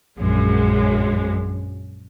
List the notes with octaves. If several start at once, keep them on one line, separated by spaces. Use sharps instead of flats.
A#1 F#2 G#3